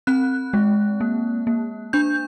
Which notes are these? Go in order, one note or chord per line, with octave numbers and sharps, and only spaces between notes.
C4 F#6
G#3
A#3
A#3
D4 G6